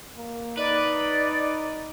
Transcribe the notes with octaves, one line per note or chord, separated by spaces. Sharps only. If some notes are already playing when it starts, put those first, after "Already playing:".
A#3
D#4 B4 D5